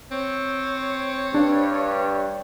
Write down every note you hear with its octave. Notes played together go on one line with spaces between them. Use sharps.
C4 C#5
G2 D4